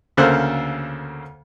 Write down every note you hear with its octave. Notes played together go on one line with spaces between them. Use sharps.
D2 C#3 A#3 A4 C5 F#6